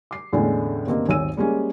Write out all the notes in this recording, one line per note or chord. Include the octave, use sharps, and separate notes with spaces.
D6 C7
E2 A2 D3 G#3 A3 C#4
G2 B2 D#3 A#3 C4
D#1 G#1 C#5 G#5 E6 D#7
G3 G#3 A#3 C#4